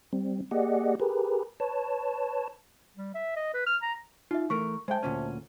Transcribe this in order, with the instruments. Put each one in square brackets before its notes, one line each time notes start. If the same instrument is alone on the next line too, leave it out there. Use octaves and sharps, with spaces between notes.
[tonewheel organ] G3 C4
A#3 G4 G#4 D5 D#5 F#5
G4 G#4 A#4 B4
B4 C#5 A5
[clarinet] G3
E5
D#5
B4
F6
A#5
[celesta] D#4 E5 [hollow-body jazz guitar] F4
[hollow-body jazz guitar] E3 A3 A#4 [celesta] C#6
[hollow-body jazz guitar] G#3 G5 [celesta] C5 E5 A5
[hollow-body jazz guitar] D2 A#2 C#4